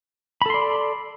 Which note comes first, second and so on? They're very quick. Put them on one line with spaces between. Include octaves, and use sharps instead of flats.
B5 A4 C6 D5